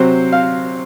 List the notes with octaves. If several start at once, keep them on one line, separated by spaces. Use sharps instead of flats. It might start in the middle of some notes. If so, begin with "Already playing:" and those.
Already playing: C3 F#3 C4 C5
F5